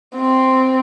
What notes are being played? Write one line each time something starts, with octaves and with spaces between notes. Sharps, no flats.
C4